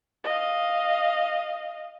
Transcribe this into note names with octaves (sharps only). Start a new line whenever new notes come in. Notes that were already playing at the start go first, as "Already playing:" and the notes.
D#5 F5